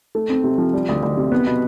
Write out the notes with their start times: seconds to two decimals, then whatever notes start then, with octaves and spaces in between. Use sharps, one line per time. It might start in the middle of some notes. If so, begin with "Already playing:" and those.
0.15 A3
0.30 C4
0.44 C3
0.58 F3
0.74 G3
0.89 D2
1.03 D2
1.17 C3
1.32 B3
1.47 B2